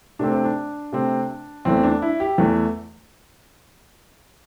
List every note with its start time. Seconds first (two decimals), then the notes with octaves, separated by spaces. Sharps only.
0.19 C3 A3 C4 D4
0.32 C4
0.44 D4
0.93 C3 A3 C4
1.65 E2 E3 A3 C4
1.83 D4
2.02 E4
2.20 G4
2.38 E2 E3 A3